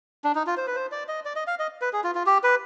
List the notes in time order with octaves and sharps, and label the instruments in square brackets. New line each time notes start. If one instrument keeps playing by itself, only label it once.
[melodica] D4
D#4
F4
C5
B4
C5
D5
D#5
D5
D#5
F5
D#5
B4
G#4
F4
F4
G4
B4